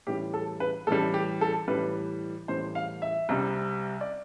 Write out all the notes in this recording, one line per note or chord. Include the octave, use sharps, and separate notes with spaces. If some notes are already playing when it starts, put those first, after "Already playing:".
A2 E3 G3 G4
A4
B4
A2 E3 G3 A4
G4
A4
A2 E3 G3 B4
A2 E3 G3 C5
F5
E5
C2 C3 G3
D5